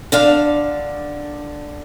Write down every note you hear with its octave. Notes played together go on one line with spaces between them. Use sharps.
D3 D4 F5